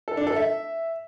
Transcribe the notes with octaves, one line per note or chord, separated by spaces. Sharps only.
A4
D4
A4
E5